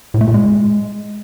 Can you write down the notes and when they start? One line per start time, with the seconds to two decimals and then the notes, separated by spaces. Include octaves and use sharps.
0.14 A2
0.21 A3
0.27 A#2
0.34 G#3